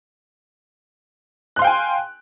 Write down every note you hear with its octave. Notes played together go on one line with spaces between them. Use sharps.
F5 G5 G#5 C6 F#6